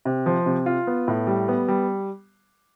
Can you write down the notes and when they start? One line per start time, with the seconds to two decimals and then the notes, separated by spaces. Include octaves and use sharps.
0.05 C3
0.26 F3
0.46 C3
0.66 F4
0.87 B3
1.08 A2
1.27 G3
1.48 B3
1.68 G3